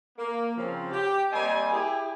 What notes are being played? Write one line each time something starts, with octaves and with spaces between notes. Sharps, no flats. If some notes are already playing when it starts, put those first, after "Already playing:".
A#3
C#3 F3 C4
G4
G3 A#3 C4 D#5 G#5
E4 G4 G#4